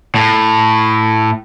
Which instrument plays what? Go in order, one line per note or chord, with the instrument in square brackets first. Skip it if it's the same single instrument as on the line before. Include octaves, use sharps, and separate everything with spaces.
[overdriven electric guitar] A2